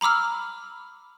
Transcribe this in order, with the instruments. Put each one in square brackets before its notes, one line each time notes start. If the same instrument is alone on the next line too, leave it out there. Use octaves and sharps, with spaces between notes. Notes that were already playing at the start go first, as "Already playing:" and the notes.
[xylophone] A#5 B5 D6 E6 F6